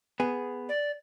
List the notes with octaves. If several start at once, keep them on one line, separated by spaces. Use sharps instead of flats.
B3 G#4
D5